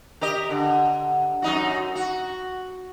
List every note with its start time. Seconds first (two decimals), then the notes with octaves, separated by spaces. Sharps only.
0.21 G4 A#4 D#5
0.50 D3
1.42 F#2 D#4 F#4
1.95 F#4